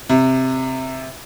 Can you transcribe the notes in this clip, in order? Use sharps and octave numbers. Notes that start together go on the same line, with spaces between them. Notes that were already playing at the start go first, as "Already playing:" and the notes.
C3